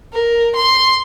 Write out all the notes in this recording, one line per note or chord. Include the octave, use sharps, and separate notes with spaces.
A#4
C6